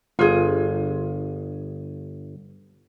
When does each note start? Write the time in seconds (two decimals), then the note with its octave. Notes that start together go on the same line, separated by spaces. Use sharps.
0.19 G1 F4 G#4